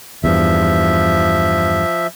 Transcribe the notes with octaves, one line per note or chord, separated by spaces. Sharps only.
E2 G2 F3 E5